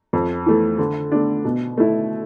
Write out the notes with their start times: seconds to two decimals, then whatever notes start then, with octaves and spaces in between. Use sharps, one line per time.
0.13 F2
0.46 E3 A3
0.78 D3
1.12 A3 D4
1.44 B2
1.78 A3 E4